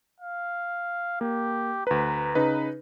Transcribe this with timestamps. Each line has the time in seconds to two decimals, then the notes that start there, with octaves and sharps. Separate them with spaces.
0.20 F5
1.21 A#3 G4
1.87 D2 B4 A#5
2.35 C#3 D#4 B4